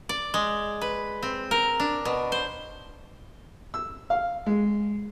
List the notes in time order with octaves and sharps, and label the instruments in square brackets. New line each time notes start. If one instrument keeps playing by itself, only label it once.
[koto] D5
G#3
B4
C4
A#4
D4
B2
C5
[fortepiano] E6
F5
G#3